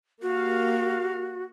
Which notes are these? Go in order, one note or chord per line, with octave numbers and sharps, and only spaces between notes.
A#3 F#4 G4 F5